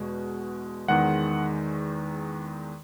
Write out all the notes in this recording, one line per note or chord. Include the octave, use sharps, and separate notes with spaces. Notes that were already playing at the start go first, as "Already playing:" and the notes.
Already playing: E2 B2 G#3
E2 D#3 G#3 F#5